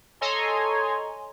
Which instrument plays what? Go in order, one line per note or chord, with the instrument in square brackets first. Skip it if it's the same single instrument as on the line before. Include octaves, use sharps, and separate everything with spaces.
[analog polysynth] A4 C#5 D#5 G#5 A#5 C6